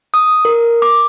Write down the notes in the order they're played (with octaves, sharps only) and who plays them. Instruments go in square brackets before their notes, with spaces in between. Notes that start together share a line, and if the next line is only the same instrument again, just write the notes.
[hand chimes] D#6
A#4
D6